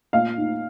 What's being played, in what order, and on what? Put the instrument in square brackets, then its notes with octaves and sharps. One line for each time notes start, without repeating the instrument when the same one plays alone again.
[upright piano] A#2 F5
D#4